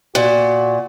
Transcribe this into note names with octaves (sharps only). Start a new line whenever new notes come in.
A#2 F#4